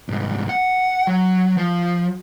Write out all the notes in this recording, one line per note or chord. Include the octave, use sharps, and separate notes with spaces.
C2 G#2
F#5
F#3
F3